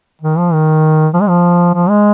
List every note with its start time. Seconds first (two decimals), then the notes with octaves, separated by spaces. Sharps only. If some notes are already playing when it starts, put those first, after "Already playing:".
0.21 D#3
0.38 F3
0.53 D#3
1.13 F3
1.21 G#3
1.28 F3
1.74 F3
1.89 G#3